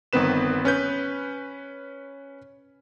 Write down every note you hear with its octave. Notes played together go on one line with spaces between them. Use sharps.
G1 D#3 B3 C4 B4 E7
C#4 B4 G6